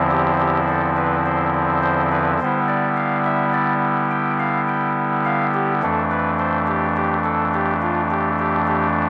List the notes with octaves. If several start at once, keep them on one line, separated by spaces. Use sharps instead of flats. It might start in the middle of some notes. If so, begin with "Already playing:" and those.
Already playing: E2 D3 F3 C4 E4
G4
G4
A4
B4
C5
C5
B4
D3 G3 B3 E4 C5
D5
F5
E5
D5
G5
F5
G5
F5
G4
F2 E3 A3 D4 A4
B4
C5
G4
G4
A4
G4
F4
G4
G4
G4